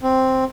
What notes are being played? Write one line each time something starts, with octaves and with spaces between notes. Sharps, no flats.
C4